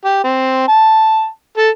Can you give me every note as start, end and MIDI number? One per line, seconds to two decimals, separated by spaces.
0.05 0.22 67
0.24 0.67 60
0.68 1.27 81
1.57 1.69 69